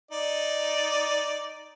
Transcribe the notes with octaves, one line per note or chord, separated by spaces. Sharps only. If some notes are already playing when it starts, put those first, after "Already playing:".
D#4 D5